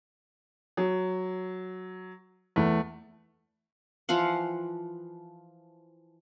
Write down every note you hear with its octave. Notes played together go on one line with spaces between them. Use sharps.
F#3
E2 A3
E3 F3 F5 F#5